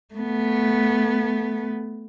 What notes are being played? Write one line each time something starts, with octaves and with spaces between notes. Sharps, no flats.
A3 B3